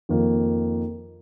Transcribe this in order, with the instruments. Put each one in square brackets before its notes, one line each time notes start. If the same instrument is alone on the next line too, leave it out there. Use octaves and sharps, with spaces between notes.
[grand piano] F2 D#3 A#3